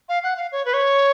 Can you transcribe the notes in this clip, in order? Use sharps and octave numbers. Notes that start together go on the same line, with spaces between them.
F5
F#5
F5
C#5
B4
C#5